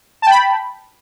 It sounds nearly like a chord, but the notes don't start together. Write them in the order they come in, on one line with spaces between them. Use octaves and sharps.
A5 G5 B5